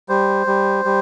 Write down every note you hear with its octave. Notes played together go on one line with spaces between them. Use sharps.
G3 C5
G3
G3